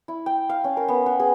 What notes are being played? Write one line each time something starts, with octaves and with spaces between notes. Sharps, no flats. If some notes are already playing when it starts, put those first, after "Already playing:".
E4
G5
F5
C#4
A#4
B3
B3
G#4